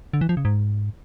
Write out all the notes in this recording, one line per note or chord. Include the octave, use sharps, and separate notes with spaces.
D3
E3
F3
C#3
G#2